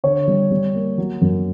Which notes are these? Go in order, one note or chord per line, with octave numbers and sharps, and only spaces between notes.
D3 C#5
G3
G3
A#3
F#3
F#2